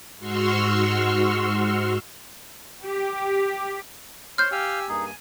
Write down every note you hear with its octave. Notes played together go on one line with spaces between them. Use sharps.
G#2 F#4 C6 C#6 E6 F6
G4
C5 C#5 C6 F6 G6
G4 F5 G5 G#5 E6
G2 A#3 D#4 G#4
G#5